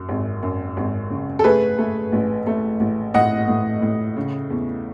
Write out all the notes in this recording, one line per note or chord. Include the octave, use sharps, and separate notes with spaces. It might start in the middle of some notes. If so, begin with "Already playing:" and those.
Already playing: F#2
G#1
F#2
G#1
C#3
A4
A3 G#4 B4
A3
A1
A3
A1
A2 D#5 F#5
A2
A2
C#3
E2